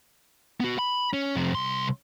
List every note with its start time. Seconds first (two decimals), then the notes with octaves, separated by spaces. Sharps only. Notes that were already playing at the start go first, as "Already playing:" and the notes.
0.60 B3 F#4
0.79 B5
1.13 C#4
1.35 F2 C3
1.55 C2 C6